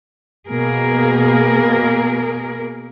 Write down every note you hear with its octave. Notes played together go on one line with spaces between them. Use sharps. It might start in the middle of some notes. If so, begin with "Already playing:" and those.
B2 A#3 G#4 A#4